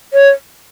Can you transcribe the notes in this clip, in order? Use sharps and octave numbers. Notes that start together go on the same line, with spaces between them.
C#5